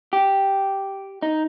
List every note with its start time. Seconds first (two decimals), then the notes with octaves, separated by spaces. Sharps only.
0.13 G4
1.23 D#4